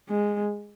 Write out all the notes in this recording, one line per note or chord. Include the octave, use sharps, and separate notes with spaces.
G#3